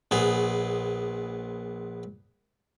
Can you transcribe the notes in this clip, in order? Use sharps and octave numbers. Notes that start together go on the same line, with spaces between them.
A#1 B3 G#4